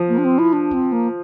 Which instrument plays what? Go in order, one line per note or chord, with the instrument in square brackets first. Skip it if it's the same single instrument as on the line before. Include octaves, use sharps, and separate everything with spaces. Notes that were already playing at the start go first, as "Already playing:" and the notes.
Already playing: [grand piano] F3
[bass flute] A#3
D4
C4
E4
D4
C4
A#3